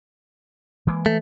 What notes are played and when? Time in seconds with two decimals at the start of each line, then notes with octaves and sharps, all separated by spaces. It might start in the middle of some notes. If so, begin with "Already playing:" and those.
0.87 E3 G#3 A#3
1.06 A3